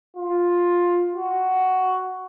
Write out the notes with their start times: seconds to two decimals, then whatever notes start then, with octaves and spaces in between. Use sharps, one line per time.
0.17 F4
1.15 F#4